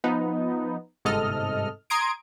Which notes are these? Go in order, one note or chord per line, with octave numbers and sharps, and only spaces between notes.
F3 B3 D#4
G1 G#2 C3 A4 D#5 F6
A#5 C6 D#6 G#6 D7